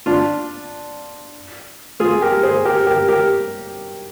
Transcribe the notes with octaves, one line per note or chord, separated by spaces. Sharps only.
D4 F4
F4 G#4
G4 A#4
G#4 C5
G4 A#4
G4 A#4
G4 A#4